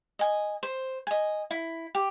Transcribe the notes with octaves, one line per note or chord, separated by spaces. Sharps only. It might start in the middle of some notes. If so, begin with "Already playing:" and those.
D#5 G#5
C5
D#5 G#5
E4
G4